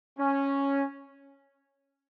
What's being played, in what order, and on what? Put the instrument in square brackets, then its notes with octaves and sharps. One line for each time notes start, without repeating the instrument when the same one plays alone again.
[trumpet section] C#4